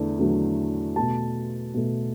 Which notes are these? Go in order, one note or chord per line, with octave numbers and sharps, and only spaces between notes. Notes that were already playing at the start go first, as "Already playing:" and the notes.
Already playing: E2 D3 A3
E2 D3 F#3 A3
B2 A3 A5
B2 A3